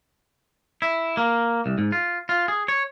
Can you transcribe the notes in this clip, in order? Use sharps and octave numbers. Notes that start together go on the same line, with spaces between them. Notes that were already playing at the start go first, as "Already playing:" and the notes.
E4
A#3
C2
G#2
F4
F4
G#4
C#5